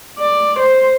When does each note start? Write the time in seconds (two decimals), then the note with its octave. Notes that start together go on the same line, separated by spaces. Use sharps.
0.19 D5
0.59 C5